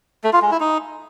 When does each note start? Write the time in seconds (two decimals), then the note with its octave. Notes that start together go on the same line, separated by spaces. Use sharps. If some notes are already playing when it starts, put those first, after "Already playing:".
0.24 A3
0.33 F4
0.42 G#3
0.51 E4
0.60 D#4